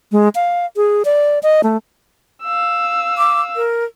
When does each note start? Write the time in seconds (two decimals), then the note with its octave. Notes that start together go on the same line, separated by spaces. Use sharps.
0.12 G#3
0.35 F5
0.76 G#4
1.05 D5
1.43 D#5
1.64 A3
2.43 F5 E6
3.18 D6
3.56 A#4